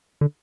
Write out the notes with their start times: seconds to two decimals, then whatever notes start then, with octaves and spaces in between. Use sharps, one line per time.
0.21 D3